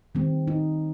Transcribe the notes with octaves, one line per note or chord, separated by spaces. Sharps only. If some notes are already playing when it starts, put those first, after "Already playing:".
D#3 G3 C4
D#4